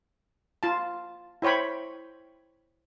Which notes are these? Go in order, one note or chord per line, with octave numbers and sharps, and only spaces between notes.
F4 A5
E4 C5 C#5 G5 B5